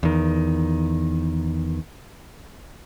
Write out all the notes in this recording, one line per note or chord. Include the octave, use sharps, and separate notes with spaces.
E2 D#3